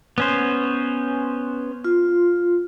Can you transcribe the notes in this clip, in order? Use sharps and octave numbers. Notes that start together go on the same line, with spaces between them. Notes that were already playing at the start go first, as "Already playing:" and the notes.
B3 C#4 C5
F4